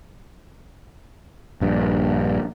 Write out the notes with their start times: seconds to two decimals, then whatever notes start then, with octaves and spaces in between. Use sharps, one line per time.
1.61 A#1 G2